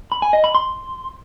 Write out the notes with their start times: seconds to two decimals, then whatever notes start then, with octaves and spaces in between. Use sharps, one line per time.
0.12 B5
0.22 G#5
0.33 D#5
0.44 B5
0.55 C6